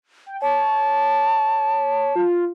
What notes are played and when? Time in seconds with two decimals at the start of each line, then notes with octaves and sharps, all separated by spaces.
0.26 G5
0.42 C#5 A5
2.16 F4